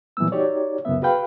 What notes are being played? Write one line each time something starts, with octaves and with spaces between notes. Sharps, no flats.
A#2 E3 F#3 G3 B3 E6
D#4 F#4 G4 C#5 D5
C2 F#2 C#3 B3 E5
F#4 G#4 B4 F5 G5 B5